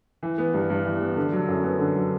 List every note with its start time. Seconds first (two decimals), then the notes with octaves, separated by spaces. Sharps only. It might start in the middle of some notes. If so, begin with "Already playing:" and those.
0.23 E3
0.38 B3
0.54 G2
0.70 G2
0.85 E3
1.01 B3
1.16 D3
1.32 F#3
1.48 F#2
1.64 B3
1.79 D3
1.95 F#3